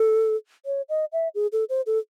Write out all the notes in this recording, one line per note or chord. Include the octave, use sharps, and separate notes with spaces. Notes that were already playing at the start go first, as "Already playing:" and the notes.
Already playing: A4
C#5
D#5
E5
G#4
A4
C5
A4